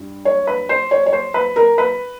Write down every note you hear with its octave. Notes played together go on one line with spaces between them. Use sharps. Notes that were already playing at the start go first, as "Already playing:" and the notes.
Already playing: G2
C#5
B4
C5
C#5
C#5
C5
B4
A#4
B4